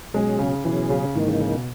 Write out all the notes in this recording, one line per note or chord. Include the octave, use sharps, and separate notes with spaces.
B2 F#3 G#3 C#4 G#4
C#3
B2 E3 F#3 C#4 G#4
C#3
G#2 D#3 E3 A#3 D#4
C#3
C#3
B2